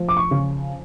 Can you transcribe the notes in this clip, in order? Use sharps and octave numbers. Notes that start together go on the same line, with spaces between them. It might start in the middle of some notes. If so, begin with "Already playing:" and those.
Already playing: F3
D6
C#6
C#3